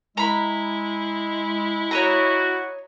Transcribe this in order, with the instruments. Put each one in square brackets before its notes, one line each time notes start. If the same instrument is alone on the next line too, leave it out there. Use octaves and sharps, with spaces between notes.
[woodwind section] G#3 [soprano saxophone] E4 [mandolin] A#5 B5
[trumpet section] F#4 [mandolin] C#5 D#5 A#5